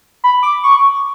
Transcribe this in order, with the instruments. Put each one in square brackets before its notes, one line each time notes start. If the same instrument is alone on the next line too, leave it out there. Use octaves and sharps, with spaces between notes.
[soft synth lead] B5
D6
C#6